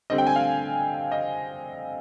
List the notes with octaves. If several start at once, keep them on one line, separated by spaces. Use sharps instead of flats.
D3 G3 C4 D#5
G5
G#5
F5
D#5